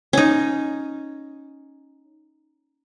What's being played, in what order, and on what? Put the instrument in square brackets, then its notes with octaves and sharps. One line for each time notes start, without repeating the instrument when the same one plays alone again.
[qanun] C#4 D#4